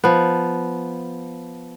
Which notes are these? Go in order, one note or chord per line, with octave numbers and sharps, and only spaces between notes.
F3 B3